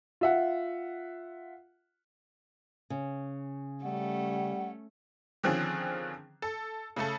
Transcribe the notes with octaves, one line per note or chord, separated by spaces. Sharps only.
F4 E5 F#5
C#3
G3 A3 C#4 F#5
D3 D#3 F3 C4 C#4 G#4
A4
C#3 A3 A4